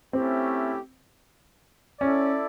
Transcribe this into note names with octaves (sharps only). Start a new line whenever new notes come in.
A3 C4 C#4 E4 G4
C#4 E4 A4 D5